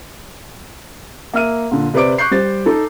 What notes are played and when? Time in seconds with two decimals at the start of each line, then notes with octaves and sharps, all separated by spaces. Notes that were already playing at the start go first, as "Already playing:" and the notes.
1.34 A#3 E5 F6 D#7
1.71 A#2 D3
1.94 C3 B4 C5 D5 D6 D7
2.18 C#6 F#6 G6 C7
2.31 G3 C5 A6
2.66 D#4 A4